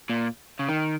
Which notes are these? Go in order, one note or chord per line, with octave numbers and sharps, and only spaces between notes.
A#2
C#3
D#3